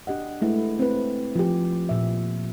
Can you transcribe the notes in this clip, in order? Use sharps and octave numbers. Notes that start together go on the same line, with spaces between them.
D4 G4 D#5 F#5
G#3 A3 E4 B4
C4 B4
F3 G4
A#2 E5